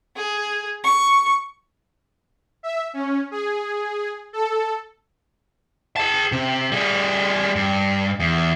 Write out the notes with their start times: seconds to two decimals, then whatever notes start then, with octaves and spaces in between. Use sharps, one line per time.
0.16 G#4
0.84 C#6
2.63 E5
2.93 C#4
3.31 G#4
4.33 A4
5.96 G#4 A5
6.32 C3
6.72 G3 G#4
7.56 G2
8.19 E2